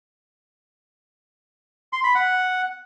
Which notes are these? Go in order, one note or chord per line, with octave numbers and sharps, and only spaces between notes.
C6
B5
F#5